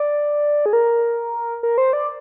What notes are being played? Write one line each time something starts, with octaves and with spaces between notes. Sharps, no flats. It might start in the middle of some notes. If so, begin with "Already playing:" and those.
Already playing: D5
G#4
A#4
A#4
C5
D5